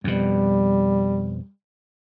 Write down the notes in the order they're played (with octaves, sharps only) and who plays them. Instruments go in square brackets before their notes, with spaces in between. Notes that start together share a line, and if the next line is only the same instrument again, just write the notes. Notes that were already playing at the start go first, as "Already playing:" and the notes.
[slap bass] F2 B2 [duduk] G3